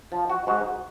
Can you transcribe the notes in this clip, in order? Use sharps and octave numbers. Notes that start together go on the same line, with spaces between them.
F3
F#4
G#2 F#4